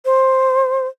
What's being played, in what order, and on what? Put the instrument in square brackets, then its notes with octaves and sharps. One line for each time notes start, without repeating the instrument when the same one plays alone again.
[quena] C5